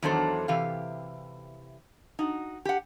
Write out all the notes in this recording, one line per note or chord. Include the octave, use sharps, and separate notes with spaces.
E2 D#3 F#3 D4 A4 C5
C3 E3 G4 F5
D#4 F#4
G4 F#5